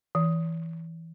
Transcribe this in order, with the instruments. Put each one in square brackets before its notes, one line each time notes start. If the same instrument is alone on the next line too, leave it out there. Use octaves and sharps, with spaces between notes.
[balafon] E3